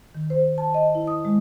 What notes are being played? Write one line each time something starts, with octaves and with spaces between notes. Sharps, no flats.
D#3
C5
A5
D#5
E4
D#6
G#3